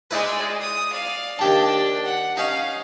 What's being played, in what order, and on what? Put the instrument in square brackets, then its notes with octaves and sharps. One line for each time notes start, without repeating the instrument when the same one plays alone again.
[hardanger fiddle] G#3 D5 [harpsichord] D#4 E4 B4
[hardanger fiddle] D#6
D5 F5
[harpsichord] D#2 G4 A5 [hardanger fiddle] D4 G5
[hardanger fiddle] F#5
[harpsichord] C#4 D#4 [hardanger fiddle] F5